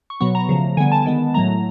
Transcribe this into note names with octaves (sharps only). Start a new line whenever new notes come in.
C#6
B2 F#3 B3 C#6
A#5
C#3 F3 A3
D3 G3 B3 G#5
A5
D#3 G#3 B3
A2 F#3 A3 A#5